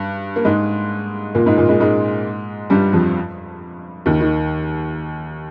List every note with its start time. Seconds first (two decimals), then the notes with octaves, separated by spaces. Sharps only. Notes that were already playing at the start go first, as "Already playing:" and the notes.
Already playing: G2
0.36 A#3
0.45 G#2 G#3
1.35 A#2 A#3
1.46 G#2 G#3
1.58 A#2 A#3
1.69 G#2 G#3
1.80 G#2 G#3
2.70 G2 G3
2.92 F2 F3
4.06 D#2 D#3
4.21 D#3